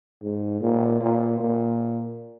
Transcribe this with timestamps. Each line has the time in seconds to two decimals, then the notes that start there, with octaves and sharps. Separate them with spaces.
0.22 G#2
0.61 A#2
1.00 A#2
1.40 A#2